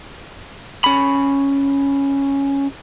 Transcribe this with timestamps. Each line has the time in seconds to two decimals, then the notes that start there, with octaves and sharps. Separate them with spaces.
0.84 C#4 B5